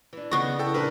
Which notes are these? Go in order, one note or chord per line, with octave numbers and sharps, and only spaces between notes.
E3 D4
C#3 B3 D#5 C#6
A4 G5
F2 A#2 F3 D4 A#4 B4